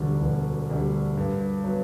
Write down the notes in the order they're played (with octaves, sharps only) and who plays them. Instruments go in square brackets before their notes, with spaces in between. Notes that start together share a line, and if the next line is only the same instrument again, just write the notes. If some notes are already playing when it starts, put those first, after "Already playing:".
Already playing: [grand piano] E1 D2 D3 G3
E1
D2 D3 G3
G2
F#3 B3